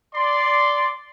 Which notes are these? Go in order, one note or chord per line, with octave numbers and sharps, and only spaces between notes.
D5 C6